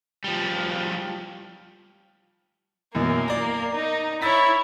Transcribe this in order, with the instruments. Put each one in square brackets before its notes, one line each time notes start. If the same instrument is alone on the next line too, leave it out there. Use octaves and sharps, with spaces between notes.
[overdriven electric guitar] F3 G3
[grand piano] F#2 B2 E3 [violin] A#3
[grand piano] D5 A#5
[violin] D#4
[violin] E4 C#5 [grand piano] E6 A6 B6